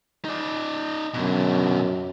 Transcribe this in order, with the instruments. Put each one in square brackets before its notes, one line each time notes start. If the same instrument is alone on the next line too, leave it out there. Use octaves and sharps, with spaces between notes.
[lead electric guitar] D#4 D5
[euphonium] F#2 [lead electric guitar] B2 D3